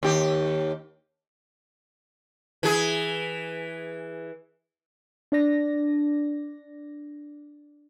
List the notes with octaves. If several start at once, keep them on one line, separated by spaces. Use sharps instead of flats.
D#2 G4
E3 G#4
D4 D5 A#6